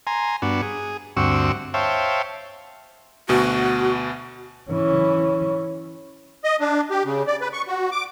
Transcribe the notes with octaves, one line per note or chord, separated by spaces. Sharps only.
G#5 A#5 C6
G2 B3 D4 F#4
G#4
D2 G2 C4 F#4 C#6 E6
C5 C#5 E5 F5 G5 A5
D2 B2 F#4
E3 C#4
D#5
D4
G4
C#3
D5
B4
C#6
F#4
D6